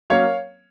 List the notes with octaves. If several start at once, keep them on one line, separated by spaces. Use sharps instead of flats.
F#3 A#3 C#4 C#5 F5